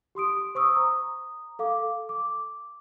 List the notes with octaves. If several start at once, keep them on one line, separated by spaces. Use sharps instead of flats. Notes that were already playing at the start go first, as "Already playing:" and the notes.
G4 C6 D#6 D7
C5 C#6 D#6 E6
A#5 D#6
A4 F5 D6
D6